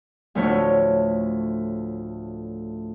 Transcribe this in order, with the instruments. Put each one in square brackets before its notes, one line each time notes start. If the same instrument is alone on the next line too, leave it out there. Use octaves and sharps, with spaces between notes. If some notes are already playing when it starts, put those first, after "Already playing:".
[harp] D2 A2 F3 A3 C#5 C#6